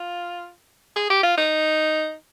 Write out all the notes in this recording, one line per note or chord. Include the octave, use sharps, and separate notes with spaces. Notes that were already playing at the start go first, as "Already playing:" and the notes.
Already playing: F4
G#4
G4
F4
D#4